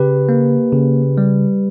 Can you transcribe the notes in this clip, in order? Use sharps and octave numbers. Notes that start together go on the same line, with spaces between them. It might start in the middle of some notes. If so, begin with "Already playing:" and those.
Already playing: C#3 G4 B4
A#3
C#3
G3